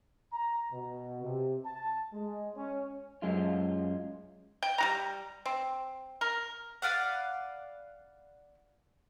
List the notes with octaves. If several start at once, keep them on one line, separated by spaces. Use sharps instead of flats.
A#5
B2
C3
A5
G#3
C#4
F#2 G#3 F4
G5
G3 F#4 A#5
C4
A#4
B4 D5 F5 F#5